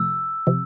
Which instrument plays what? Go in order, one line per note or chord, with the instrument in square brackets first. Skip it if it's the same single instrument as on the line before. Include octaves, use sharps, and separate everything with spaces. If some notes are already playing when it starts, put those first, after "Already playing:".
Already playing: [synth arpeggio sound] F2 C3 F3 A3 [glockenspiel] E6
[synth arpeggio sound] C3 F3